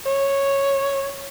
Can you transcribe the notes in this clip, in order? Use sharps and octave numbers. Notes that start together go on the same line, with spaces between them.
C#5